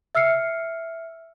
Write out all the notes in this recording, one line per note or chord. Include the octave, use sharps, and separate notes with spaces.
E5 E6 F6 C7 C#7